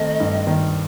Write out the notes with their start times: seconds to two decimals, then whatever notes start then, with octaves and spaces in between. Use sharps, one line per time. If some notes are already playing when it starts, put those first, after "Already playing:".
Already playing: D#3 A3 C4 D#5
0.20 G2
0.47 D#3